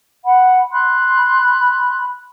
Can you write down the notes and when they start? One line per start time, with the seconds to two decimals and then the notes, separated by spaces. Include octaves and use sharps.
0.23 F#5 B5
0.70 B5 C6 F#6